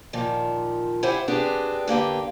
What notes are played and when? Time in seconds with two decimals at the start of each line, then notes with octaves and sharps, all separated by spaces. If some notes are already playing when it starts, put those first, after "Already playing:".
0.13 A#2 D#3 F3
1.03 E4 G4 C5 F#5 G#5
1.28 B3 C4 D4 G4 G#4
1.88 D3 A#3 G4 B4